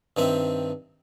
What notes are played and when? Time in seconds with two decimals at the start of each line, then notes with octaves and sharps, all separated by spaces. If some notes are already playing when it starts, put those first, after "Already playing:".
0.17 G2 D#3 C4 E5